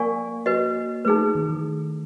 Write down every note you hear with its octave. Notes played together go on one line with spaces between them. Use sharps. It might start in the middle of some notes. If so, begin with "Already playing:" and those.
Already playing: A#3 A#4 D5 F5 G#5 C#6
F#4 B4 D#5
A3 D#4 G#4 B4
D#3
E3